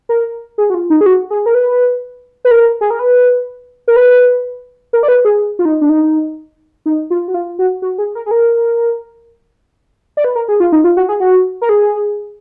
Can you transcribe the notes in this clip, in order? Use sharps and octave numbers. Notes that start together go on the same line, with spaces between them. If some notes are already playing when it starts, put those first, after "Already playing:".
A#4
G#4
F#4
F4
D#4
G#4
F#4
G#4
A#4
B4
B4
A#4
G#4
A#4
B4
A#4
B4
A#4
D5
B4
G#4
F4
D#4
D4
D#4
D#4
F4
F#4
F4
F#4
F#4
G#4
A#4
G#4
A#4
D5
B4
A#4
G#4
F4
D#4
F4
F#4
G#4
F#4
A#4
G#4